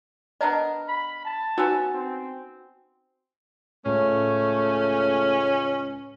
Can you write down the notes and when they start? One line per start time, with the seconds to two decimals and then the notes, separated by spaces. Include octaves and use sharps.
0.41 B3 D4 A#4 D#5
0.88 B5
1.25 A5
1.58 B3 C#4 D#4 F#4 E6
1.93 C4
3.85 C#2 A2 A3 C#4